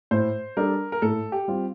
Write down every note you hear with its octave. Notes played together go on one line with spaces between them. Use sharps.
A2 C5
G3 D4 A4 A#4
A#4
A2 A4
G4
G3 C4 F4